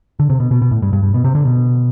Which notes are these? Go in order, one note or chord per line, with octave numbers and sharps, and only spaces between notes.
D3
C3
B2
B2
B2
A2
G2
G2
G2
B2
C3
D3
B2